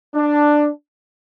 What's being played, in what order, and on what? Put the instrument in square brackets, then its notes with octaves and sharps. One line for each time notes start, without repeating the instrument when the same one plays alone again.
[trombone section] D4